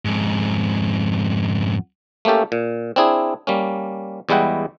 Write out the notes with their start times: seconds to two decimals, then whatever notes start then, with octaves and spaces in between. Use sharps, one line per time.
0.05 F2 G#2
2.25 A3 A#3 C#4 G4 A4
2.52 A#2
2.96 C4 D4 E4 G#4
3.47 G3 A#3 C#4
4.29 E2 G3 G#3 E4 F#5 G5